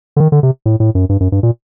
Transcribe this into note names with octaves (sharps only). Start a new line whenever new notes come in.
D3
D#3
D3
C3
A2
A2
F#2
G2
F#2
G2
A#2